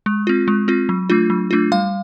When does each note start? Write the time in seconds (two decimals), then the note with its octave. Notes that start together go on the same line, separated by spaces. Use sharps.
0.06 G#3
0.27 C4 F4
0.48 G#3
0.68 C4 F4
0.89 F#3
1.10 A3 D4 F4
1.30 F#3
1.51 A3 D4 F4
1.72 G3 F5